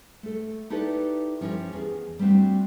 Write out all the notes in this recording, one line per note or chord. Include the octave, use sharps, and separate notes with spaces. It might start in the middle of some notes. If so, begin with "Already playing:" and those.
A3 A4
D#4 E4 G4 A4 B4 D5
F3 C#4 E4 G4 A#4
E2 G#4
G3 A3 C4 D4 F#4